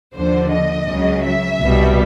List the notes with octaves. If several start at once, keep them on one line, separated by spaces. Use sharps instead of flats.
D#2 D3 F3 C5
D#5
C#2 C#3 F#3
E5
C2 B2 G3